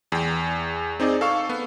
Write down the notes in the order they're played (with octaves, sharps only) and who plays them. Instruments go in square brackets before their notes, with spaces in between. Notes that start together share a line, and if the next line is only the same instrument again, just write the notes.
[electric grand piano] E2 G5
C4 D#4 G#4 D5
A4 F5 C#6 E6
B3